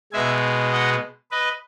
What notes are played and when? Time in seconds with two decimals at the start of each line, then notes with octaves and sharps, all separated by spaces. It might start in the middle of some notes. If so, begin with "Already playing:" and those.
0.12 B2 G#3 E5 G#5
0.72 D#5 F#5
1.31 B4 D#5